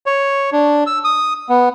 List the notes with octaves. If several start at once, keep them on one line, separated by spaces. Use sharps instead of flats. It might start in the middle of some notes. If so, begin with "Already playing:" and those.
C#5
D4
E6
D#6
B3